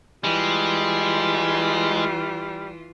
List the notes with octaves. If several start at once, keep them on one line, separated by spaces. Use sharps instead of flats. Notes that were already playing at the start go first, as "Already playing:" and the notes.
E3 G3 G#3 F4